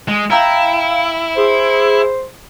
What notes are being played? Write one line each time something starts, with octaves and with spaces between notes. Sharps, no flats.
G#3
E4 F5 G5 A#5 E6
G#4 C5